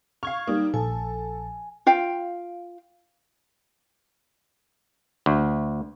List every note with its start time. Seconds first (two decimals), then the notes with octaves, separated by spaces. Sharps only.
0.23 F5 C#6 F6 G#6
0.47 G3 A#3 D#4
0.74 A#1 A4 G#5
1.86 F4 F5 G5
5.26 D2